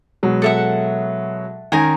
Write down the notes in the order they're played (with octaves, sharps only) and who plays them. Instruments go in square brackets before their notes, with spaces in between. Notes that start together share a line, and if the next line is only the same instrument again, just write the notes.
[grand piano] B2 F#3 G#3
[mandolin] A4 E5 F#5
[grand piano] D#3 C#4 [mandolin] A#4 G#5 A#5